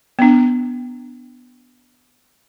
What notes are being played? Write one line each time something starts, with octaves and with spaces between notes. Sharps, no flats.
B3 D4